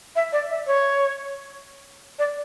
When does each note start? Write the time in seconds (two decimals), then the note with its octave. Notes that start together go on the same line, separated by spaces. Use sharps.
0.16 E5
0.32 D5
0.50 E5
0.67 C#5
2.19 D5